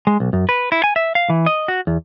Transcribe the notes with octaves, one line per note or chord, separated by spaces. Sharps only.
G#3
B1
F#2
B4
E4
G#5
E5
F5
E3
D#5
F#4
E2